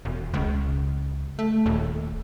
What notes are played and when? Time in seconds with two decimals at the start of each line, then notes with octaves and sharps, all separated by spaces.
0.05 E1
0.34 C#2
1.39 A3
1.66 D#1